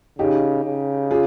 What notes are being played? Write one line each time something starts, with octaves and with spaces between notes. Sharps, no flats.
C#3 D#4 G4
C#3
F4 G#4